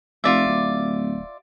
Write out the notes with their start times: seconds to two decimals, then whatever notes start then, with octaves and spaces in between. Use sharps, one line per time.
0.24 F1 F4 D5 E5
0.47 D1